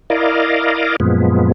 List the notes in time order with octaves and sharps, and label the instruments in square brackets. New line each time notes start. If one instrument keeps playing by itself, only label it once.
[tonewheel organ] E4 A#4 D5 D#5 F5
F#2 A#2 F3 G#3 B3